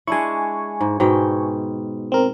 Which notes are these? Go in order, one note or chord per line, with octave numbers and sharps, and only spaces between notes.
G#3 D4 E4 G#5 C#6
G#2
G#2 B2 G5
C4 A#4